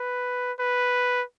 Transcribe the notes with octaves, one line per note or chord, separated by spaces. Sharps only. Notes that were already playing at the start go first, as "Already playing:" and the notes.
Already playing: B4
B4